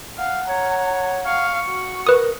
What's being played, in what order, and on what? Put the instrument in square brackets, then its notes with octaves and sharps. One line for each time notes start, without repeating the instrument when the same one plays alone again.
[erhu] F5 [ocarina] F#5
[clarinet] C#5 [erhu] A#5
[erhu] F5 [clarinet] C#6
[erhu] F#4
[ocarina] A#4 [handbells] B4 D#6